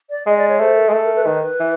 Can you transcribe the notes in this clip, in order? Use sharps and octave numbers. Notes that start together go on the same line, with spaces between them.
D5
G#3 D#5
D5
C#5
A3 C5
A#4
G#3 G#4
A3 A4
A#4
B4
D#3 B4
B4
E3